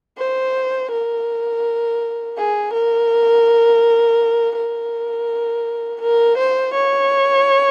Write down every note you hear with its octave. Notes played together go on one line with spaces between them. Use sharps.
C5
A#4
G#4
A#4
A#4
A#4
C5
C#5